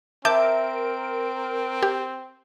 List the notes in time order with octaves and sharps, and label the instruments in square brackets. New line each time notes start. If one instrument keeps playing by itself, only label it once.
[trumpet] C4 [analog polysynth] A#4 D7 [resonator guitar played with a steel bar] E5 [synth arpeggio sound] A5 D6 G6
[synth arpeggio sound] G4